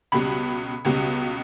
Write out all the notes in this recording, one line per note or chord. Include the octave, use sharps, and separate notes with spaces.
C#2 B2 G3 B5
C#2 B2 G3